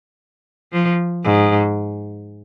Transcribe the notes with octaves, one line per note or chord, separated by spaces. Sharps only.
F3
G#2